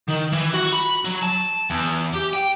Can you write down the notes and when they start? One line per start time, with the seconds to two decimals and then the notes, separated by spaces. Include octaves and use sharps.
0.08 D#3
0.32 E3
0.54 F#4
0.73 B5
1.05 F#3
1.23 A5
1.70 E2
2.13 G4
2.33 G5